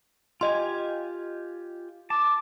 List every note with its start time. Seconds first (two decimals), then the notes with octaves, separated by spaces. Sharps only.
0.41 F4 G4 D#5 G#5 C6
2.10 A5 D6